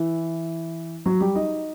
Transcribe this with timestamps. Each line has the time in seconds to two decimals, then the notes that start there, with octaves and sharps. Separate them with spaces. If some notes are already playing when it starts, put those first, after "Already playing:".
Already playing: E3 E4
1.06 F#3 F#4
1.20 G3 G4
1.35 D#4 D#5